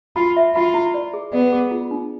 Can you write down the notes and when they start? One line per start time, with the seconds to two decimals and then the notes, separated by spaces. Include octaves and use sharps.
0.16 F4 B5
0.37 E5
0.56 F4 B5
0.74 E4
0.94 D5
1.14 G#4
1.33 B3 D5
1.52 G#4
1.71 F4
1.91 D4